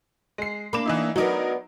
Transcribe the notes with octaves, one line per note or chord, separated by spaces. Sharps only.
G#3 C7
A#3 D4 B5 D6 E7
E3 D#4 E4
F#3 B3 D4 D#4 F#4 A#4